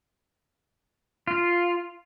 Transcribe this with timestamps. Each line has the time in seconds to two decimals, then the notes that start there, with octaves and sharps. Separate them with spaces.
1.27 F4